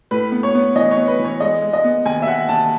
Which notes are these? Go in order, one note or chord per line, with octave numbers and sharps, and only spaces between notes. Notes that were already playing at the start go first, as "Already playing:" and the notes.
A2 B4
B3
C#5
B3
E3 D#5
C#5
B3
B4
E3 C#5
G#3 D#5
G#3
D#5
B3
D#2 G#5
E5
D#2 F#5
D#2 A5